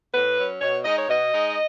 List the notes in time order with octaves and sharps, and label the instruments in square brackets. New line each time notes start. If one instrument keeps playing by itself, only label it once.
[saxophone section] A2 B4
F#3 C#4
B2 C#5
G#3 D#4 D#5
C#5
B2 D#5
G#3 D#4